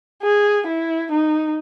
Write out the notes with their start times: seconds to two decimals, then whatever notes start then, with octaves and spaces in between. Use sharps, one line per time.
0.23 G#4
0.67 E4
1.11 D#4